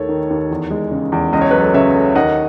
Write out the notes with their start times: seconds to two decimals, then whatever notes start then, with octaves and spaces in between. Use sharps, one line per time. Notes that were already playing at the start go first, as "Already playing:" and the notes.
Already playing: D#2 A3 A4 C#5
0.09 D#3
0.30 D#2
0.51 E2
0.71 G#3
0.91 C#3
1.12 E2
1.32 C#2 D#5
1.41 C#5
1.51 F#3 B4
1.59 A4 C#5
1.74 C#3 C#5 E5
1.94 A3
2.15 D#2 D#5 F#5